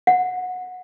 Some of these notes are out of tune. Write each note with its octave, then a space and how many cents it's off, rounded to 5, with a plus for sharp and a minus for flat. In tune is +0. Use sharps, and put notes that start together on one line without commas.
F#5 -20